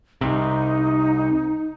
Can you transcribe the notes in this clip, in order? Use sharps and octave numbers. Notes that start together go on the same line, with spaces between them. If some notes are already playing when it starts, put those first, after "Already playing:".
C2 C3 D#4